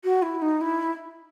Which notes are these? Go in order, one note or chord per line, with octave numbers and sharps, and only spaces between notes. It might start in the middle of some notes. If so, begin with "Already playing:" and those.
F#4
E4
D#4
E4